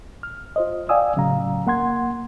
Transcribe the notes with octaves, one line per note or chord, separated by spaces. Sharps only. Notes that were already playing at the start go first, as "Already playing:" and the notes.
F6
F4 C5 D#5
D5 F5 G5 G#5 D#6 E6
A2 C#3 F#3 F5 A#5
A#3 F#5 C6 G#6